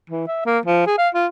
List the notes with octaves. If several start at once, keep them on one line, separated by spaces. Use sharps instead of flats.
E3
E5
A#3
F3
G#4
F5
F4